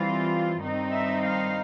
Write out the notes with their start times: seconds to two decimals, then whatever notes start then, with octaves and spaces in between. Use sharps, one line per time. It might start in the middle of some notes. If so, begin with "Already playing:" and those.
Already playing: E3 G3 C4 F4 F5
0.61 G2 D#3 G3 C4 D#4
0.92 E5
1.24 F5